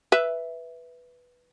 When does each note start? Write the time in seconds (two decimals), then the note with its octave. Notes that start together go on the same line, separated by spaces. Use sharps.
0.12 B4 E5